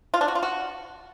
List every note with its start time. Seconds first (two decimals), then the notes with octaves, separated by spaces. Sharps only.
0.14 F4
0.21 D4
0.28 F#4
0.35 F4
0.43 F#4